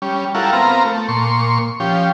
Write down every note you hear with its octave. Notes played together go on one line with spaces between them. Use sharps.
G3 C#4
G3 E4 F4 A4 A#4 F#5
B3 C4 F4 A#4 A#5
A3
A#2 C6 C#6
F3 C#4 G4